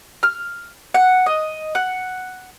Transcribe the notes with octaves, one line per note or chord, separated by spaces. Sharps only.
F6
F#5
D#5
F#5